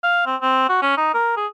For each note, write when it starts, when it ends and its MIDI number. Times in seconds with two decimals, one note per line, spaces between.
0.03 0.25 77
0.26 0.36 60
0.42 0.66 60
0.69 0.78 66
0.82 0.94 61
0.97 1.13 63
1.14 1.32 70
1.37 1.47 68